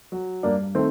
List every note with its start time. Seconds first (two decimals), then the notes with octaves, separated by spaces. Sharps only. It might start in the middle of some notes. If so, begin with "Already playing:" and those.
0.12 F#3
0.43 G2 A#3 D4
0.75 D#3 A3 C4